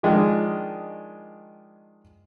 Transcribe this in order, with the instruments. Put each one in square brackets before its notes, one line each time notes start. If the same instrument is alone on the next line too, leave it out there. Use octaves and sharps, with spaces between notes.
[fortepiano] D#3 F3 G#3 D4